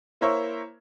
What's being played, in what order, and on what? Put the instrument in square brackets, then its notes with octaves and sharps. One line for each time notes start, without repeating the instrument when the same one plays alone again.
[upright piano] A#3 E4 A#4 C5 C#5 E5